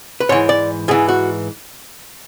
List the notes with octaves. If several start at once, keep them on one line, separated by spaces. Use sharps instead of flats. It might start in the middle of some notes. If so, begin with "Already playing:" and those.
B4
G#2 E3 C#5
D5
G#2 E3 G#4
F#4